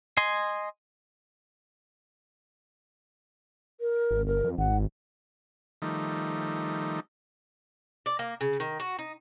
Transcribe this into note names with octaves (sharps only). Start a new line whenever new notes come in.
D#5 G#5 C6
A#4
G#1
G1 A#4
F2
G#1 F#5
D#3 F3 G3 A3 D#4
D5
A#3
C#3
D#3
F#4
D#4